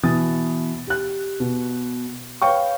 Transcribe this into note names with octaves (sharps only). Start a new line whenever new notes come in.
B2 E3 D#6 A6
G4 F#6
B2
B4 C#5 F5 G5 C#6